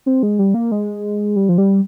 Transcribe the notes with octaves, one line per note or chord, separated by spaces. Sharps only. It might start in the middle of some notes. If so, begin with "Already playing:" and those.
C4
G#3
G3
A#3
G#3
G3
F3
G3